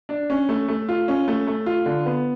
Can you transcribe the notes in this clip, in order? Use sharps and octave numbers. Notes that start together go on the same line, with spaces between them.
D4
C#4
A3
A3
F4
C#4
A3
A3
F4
D3
B3